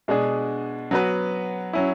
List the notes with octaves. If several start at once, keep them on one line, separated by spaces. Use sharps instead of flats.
B2 G#3 D4 G#4
F#3 B3 F#4 B4
F#3 C#4 E4